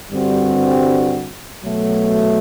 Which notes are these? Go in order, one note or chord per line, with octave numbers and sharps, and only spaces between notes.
G2 D3 G3 C4 F#4
B2 F#3 A3